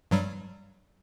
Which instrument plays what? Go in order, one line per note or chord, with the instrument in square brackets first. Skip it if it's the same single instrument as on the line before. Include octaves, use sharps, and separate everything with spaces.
[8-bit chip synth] G2 F#3 G3